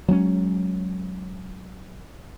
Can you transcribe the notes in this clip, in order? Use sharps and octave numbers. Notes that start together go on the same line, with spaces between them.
F#3 G#3 C4 C#4